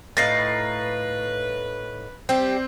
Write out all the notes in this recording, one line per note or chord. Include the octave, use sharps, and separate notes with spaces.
A2 D#4 B4 F5 A6 A#6 C7
G3 C4 G4 C5